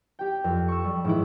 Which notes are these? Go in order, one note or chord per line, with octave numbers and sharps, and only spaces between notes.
G4 G5
F2
C#6 E6
G3
G#2 E3 E4